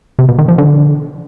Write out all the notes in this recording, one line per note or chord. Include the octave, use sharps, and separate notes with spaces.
C3
B2
D#3
F3
D3